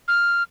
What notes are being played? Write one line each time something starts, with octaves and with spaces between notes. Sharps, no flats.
F6